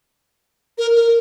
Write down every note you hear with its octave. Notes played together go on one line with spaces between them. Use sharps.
A#4
A#4